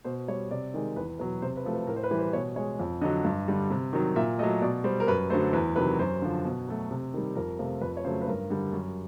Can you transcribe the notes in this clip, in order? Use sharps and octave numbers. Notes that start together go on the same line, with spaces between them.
B2 C5
G3 C#5
C3 D5
D#3 G#3
E2 B4
B2 F#3 B4
C3 C5
B4
F3 A3
B4
A2 A#4
C5
B4
E3 G3
C5
B2 C#5
G#3 C#5
F2
D3 F#3 D#5
G2
D3 G3
C3
D#3 F#3
A#2 E5
F#3 A3 D#5
B2 D5
G3 C5
A#4
F#2 B4
D3 F#3 A3 C5
E2 B4
C3 D#3 F#3 B4
F#2 C5
D3 F3
B2
F#3 A3
C3
D#3 G3
F2 A#4
C3 F3 A3
F2 B4
C#5
C#3 F#3 A3 C5
B4
G2 A#4
D3 G3
F#2